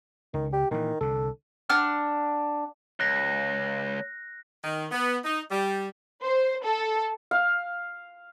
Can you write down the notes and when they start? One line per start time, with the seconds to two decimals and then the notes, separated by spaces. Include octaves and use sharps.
0.34 C#2 D#3
0.53 G4
0.71 A#2 D#3 E3
1.01 C2 D3 A4
1.70 D4 F#5 F6
3.00 C#2 F#6 A#6
4.64 D#3
4.91 B3
5.24 D#4
5.50 G3
6.23 C5
6.64 A4
7.31 F5